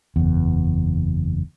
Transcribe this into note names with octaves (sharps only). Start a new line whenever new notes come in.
F#1 E2